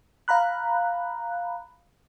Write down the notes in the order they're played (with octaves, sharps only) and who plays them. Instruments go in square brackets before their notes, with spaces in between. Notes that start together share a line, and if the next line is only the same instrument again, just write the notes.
[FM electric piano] F5 A#5 B5 F#6